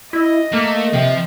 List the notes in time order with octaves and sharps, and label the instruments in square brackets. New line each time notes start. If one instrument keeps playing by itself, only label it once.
[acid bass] E4 [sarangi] D#5
[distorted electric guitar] A3 [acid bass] A#3
[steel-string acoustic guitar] C3 [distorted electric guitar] F3